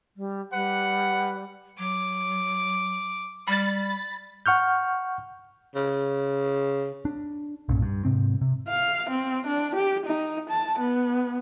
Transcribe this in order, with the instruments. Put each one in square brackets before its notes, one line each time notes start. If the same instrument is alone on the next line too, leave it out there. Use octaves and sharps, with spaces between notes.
[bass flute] G3
[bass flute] G3 [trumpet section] B4 F#5
[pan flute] F#3 [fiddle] D6
[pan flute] G3 [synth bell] B5 A6
[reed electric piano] F#5 C#6 F6 G6
[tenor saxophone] C#3
[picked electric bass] D4
B1 G2 A#2 C#4
G2
G#2 C3 C4
C3
[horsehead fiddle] F5
C4
D4
G4
D#4
A5
B3